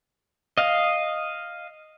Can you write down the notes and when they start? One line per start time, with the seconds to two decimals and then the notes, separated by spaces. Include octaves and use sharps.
0.58 D#5 F5